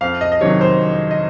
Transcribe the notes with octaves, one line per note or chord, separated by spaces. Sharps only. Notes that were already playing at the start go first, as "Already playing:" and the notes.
F2 F5
D#5
D#5
C3 D#3 F#3 C#5
C5
F2
D#5